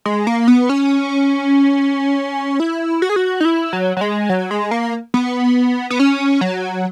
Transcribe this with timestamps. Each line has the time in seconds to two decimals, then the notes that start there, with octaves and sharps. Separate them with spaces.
0.05 G#3
0.27 A#3
0.48 B3
0.69 C#4
2.60 E4
3.02 F#4
3.09 G#4
3.16 F#4
3.40 D#4
3.45 E4
3.73 F#3
3.97 F#3
4.01 G#3
4.29 F#3
4.51 G#3
4.71 A#3
5.14 B3
5.90 B3
5.99 C#4
6.41 F#3